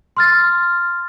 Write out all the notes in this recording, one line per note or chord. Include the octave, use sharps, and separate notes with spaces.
C6 F6 A6